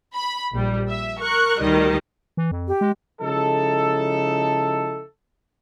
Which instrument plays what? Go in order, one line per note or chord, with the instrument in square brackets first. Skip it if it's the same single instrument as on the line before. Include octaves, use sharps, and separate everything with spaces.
[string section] B5
A#1 G3
E5
A#4 C#6 F#6
D2 D#3 G3 D#5
[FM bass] E3
F2
[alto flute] G4
[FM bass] G#3
[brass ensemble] C#3 F3 G#3 D#4 E4 A4